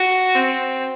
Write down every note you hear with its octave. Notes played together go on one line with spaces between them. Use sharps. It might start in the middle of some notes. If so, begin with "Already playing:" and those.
Already playing: F#4
C4